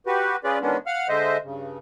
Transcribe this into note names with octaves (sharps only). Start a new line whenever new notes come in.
F#4 G4 B4
C#4 F4 G#4 B4 D5
D#3 E3 G#3 B3 C#4 D4
F5 F#5 F6
D3 G#3 C5 D#5 E5
G2 C#3